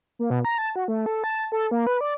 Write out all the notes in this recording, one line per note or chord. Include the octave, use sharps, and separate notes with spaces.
A#3
B2
A#5
A5
F#4
A3
A4
A5
A4
A#3
B4
D5